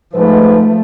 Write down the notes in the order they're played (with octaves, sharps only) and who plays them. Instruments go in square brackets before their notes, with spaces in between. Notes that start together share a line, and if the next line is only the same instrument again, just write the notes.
[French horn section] G#2 B4 [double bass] F3 A3